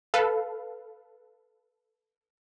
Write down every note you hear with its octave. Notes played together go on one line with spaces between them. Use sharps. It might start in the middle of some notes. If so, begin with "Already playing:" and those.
A4 B4 F5